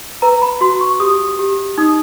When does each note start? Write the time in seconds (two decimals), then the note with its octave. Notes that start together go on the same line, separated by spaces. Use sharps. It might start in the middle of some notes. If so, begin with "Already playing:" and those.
0.22 B4 A#5
0.42 B5
0.61 F#4 C6
0.81 C#6
1.00 G4 D#6
1.39 G4
1.78 D#4 D#6